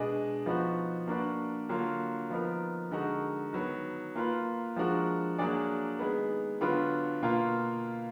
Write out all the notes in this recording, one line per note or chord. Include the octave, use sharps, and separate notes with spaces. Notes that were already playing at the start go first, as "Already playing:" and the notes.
Already playing: B2 G#3 D4 G#4 D#5
F3 B3 D#4 F#4
A#3 D4 F#4 B4 D5
D3 F#3 A#3 F4
F3 B3 D#4 A#4
D3 G#3 D#4 F#4 A#4
D#3 F#3 B3
A#3 F4 B4
F3 G#3 D4 F#4 A#4
F#3 A#3 D4 G#4 D5
D#3 G#3 B3
D3 F#3 B3 D4 F4
B2 A#3 F4